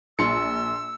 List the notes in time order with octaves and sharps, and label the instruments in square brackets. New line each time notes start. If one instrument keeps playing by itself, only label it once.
[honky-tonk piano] A#1 [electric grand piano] C6 C#7 [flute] E6